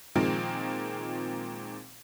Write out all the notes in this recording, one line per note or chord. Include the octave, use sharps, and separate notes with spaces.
A#2 D#3 F3 G#3 C4